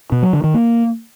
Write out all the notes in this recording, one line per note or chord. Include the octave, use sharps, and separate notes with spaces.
B2
F#3
D3
D#3
A#3